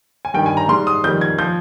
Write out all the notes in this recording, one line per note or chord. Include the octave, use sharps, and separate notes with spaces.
G#5
G2 D#3 G3 G5
G#5
A#5
G#2 G3 C6
D#6
F2 D#3 G3 G6
G#6
F3 G6